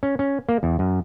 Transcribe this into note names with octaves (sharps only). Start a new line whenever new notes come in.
C#4
C#4
A#3
E2
F#2